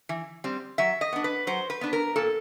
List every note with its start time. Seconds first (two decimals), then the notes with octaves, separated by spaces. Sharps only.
0.09 E3
0.44 G3 C4
0.78 F#3 E5
1.01 D#5
1.13 B3 D4
1.24 B4
1.47 F#3 C5
1.70 B4
1.81 B3 D4
1.93 A#4
2.16 A#2 A4